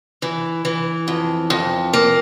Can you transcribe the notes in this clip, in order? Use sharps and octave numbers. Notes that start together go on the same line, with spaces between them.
E3
E3
F2
F2
A#3